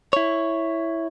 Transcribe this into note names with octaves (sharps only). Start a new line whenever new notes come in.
E4 C#5